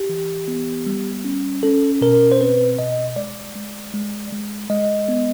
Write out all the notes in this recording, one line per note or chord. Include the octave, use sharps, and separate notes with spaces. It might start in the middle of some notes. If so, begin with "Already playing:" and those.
Already playing: G4
E3
B3
G3
C#4
C#4 A4
B2 A#4
C5
C4 B4
B2 D#5
G#3 D5
G#3
G#3
G#3
G#3 D#5
B3